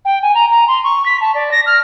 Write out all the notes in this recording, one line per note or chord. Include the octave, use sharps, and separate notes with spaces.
G5
G#5
A#5
A#5
C6
C#6
B6
A5
D5
A#6
F6